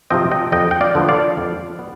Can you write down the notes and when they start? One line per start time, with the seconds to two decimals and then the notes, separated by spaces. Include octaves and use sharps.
0.10 C3 F3 C4 D#5 G5
0.31 D#5 G5
0.52 F2 D#5 G5
0.71 G5
0.81 D5 F5
0.95 D3 F3 B3
1.09 D5 F5
1.37 F2
1.79 B3